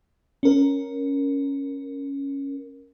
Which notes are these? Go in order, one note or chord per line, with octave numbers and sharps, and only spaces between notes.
C#4 A#4